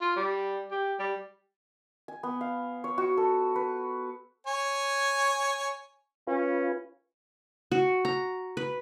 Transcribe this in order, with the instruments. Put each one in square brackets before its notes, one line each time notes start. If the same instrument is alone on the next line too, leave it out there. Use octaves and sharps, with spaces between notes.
[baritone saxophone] F4
G3
G4
G3
[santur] G#5
B3
F5
C#5
F#4
A4
B4
[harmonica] C#5 G#5
[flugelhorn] C#4 [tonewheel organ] F4 B4
[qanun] F#4
A#5
B4